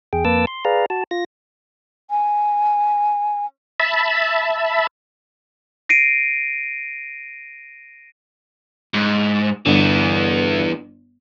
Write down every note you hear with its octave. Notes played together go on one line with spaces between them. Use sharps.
E2 G#4 G5
F2 A#3 B4 A5 D6 E6
C6
G#4 B4 D5 F5 A#5
F#4 A5
F4 A#6
G#5
E5 A5 B5
A#6 C7 D7 D#7
G#2
G1 E3 B3